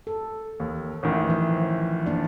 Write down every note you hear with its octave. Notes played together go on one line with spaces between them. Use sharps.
A4
D#2
A1 D#3 E3
F3
A#3 D4 D5